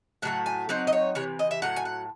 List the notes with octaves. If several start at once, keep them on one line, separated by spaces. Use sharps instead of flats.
A2 F#3 A3 F#5
G#5
F#3 C4 D#4 F#5
D#5
C#5
C3 E3 C#5
D#5
E5
A2 F#3 F#5
G#5
F#5